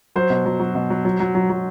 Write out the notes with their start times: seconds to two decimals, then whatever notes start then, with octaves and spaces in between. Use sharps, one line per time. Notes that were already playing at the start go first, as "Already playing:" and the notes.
0.16 F#3 C5
0.30 B2
0.46 F#3
0.60 F#3
0.75 B2
0.90 F#3
1.05 F#3
1.20 F#3
1.35 F#3
1.50 F#3